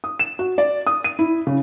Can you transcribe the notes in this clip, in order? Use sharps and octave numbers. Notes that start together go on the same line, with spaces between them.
D#6
E7
F#4
D5
D#6
D#7
E4
C#3